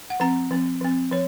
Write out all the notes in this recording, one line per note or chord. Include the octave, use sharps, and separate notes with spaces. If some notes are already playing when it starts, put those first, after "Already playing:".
F#5
F3 C4 A#5
F3 C4
F3 C4
F3 C#5